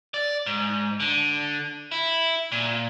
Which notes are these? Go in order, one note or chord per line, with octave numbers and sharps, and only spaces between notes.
D5
G#2
D3
E4
A#2